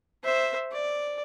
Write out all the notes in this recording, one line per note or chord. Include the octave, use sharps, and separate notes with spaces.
C5 E5
D5